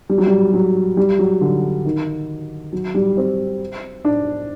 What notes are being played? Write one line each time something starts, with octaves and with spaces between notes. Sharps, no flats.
G3
F#3
G3
F#3
G3
F#3
D3
D#3
F#3
G3
C4
D4